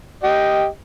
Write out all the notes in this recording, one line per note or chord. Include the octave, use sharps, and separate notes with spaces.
G4 D#5